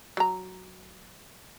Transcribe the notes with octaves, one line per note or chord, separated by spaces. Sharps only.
F#3 A#5